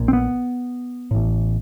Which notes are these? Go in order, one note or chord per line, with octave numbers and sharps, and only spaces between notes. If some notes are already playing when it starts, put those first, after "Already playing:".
Already playing: A#1 A#2
C4
B3
A1 A2